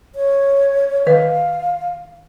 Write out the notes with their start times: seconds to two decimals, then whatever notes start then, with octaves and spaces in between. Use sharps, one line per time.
0.15 C#5
1.07 D#3 B4 F5